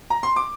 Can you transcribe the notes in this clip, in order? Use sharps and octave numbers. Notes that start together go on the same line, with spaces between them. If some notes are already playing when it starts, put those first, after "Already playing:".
A#5
C6
D6